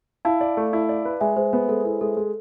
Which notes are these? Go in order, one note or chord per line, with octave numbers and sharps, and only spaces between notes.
E4 F5 A5
D5
A3
E4
D5
B4
G#3 E5 G#5
G#3 C5
B3 B4
G#3 A4
E4 A4
G#3 A4
G#3 A4